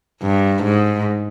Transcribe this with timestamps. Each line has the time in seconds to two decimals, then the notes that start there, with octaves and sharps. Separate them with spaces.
0.22 G2
0.64 G#2